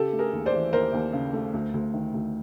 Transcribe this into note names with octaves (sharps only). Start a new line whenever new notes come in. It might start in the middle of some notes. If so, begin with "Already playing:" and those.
Already playing: C#3 G4 A4
A3
G#4 A#4
D#2
C5 D5
E3
D#2 A#4 C5
D#2
C#3
A3
D2
D2
D#3
D2